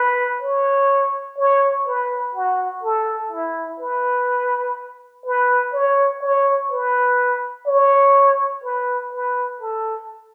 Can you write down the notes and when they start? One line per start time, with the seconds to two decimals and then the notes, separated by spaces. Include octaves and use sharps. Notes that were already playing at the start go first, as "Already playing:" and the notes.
Already playing: B4
0.42 C#5
1.38 C#5
1.87 B4
2.35 F#4
2.83 A4
3.31 E4
3.80 B4
5.26 B4
5.74 C#5
6.22 C#5
6.71 B4
7.67 C#5
8.64 B4
9.13 B4
9.61 A4